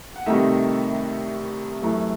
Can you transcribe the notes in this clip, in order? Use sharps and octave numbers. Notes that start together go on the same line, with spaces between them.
F#5
C2 C3 D#3 A3 D#4 E5
F#2 E3 A3